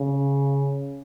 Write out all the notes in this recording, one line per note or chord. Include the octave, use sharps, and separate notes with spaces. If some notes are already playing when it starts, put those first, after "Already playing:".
Already playing: C#3